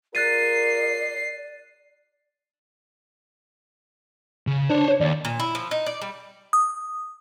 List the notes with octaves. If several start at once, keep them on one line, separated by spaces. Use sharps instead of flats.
F4 G#4 A#4 D5 F#6 A6 C7 D#7
C#3
D4 C5 C#5
C#5
D#2 D5
A#2
E4
F3
D#4
D5
G3
D#6